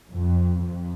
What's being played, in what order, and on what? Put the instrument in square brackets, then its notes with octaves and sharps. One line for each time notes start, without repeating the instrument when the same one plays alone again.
[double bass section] F2
F2